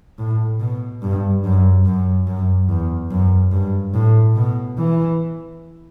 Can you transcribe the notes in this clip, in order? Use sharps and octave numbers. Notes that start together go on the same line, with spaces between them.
A2
B2
G2
F#2
F#2
F#2
E2
F#2
G2
A2
B2
E3